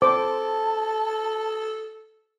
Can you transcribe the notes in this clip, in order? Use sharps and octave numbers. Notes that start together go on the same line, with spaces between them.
A4 C5 A5 D6